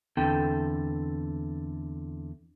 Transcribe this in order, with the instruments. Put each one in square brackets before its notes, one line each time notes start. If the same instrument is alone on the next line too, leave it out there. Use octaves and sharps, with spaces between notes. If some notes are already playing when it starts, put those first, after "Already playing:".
[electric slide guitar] E2 D3 C4 A4 G5